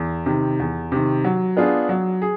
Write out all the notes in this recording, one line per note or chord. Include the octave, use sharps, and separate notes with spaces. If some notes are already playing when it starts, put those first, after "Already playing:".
Already playing: E2
C3 D#3
E2
C3 D#3
F#3
B3 D4 F4 G#4
F#3
G#4